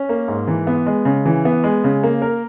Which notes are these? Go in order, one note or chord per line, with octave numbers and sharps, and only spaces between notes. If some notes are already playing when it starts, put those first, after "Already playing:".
Already playing: C#4
A#3
G#2
E3
B3
G#3
C#3
E3
B3
G#3
C#3
A#3
A#4